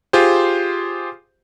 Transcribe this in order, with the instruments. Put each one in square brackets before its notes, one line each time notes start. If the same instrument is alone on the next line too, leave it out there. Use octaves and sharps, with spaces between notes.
[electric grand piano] F4 G4 G#4 C5